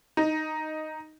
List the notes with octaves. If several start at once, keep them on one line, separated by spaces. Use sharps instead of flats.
D#4